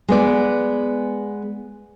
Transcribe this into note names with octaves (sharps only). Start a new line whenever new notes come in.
G#3 B3 D5